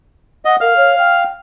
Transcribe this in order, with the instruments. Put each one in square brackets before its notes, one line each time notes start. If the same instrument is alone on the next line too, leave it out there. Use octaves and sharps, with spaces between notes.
[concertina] D#5 [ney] F#5
[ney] A#4 [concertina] F5 F6
[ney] C#5
G5